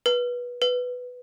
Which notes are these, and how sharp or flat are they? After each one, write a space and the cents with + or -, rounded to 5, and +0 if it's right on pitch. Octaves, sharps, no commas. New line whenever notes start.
B4 -20
B4 +5